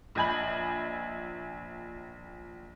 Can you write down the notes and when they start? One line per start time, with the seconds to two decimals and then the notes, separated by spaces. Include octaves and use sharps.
0.15 A#1 D#5 G#5 B5 F#7